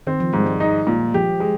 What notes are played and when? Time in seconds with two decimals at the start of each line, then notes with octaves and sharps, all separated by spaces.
0.07 D#3 C4
0.20 F3
0.33 G#2 G3
0.46 G#3
0.60 D#4
0.87 A#2
1.14 F3 G4
1.40 G#3